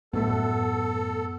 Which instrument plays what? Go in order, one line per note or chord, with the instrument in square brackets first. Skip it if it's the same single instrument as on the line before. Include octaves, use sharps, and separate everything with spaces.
[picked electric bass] F#2 A2 A3 [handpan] B3 [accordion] A4